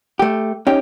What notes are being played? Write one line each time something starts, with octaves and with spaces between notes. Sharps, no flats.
A3 G4
C#4 D#4 G4